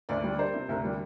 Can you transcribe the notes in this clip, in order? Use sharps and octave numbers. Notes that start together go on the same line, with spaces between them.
D2 D5
G3
D4 C5
C3
D2 A#4
G3